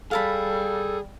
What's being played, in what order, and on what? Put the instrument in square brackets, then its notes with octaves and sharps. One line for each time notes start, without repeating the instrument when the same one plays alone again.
[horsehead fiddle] G3 [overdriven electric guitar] G#4 [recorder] A4 [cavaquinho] F5 A5 B5